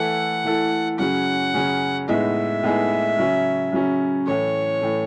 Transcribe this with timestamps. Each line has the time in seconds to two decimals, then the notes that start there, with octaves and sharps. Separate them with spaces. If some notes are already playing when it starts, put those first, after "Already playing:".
Already playing: E3 A3 E4 A4 F#5
0.44 E3 A3 E4 A4
0.99 F#2 C#3 F#3 C#4 G#4 F#5
1.53 F#2 C#3 F#3 C#4 G#4
2.08 A2 G#3 B3 D#4 G#4 E5
2.63 A2 G#3 B3 D#4 G#4
3.18 C#3 F#3 C#4
3.72 C#3 F#3 C#4
4.27 A2 E3 A3 C#5
4.81 A2 E3 A3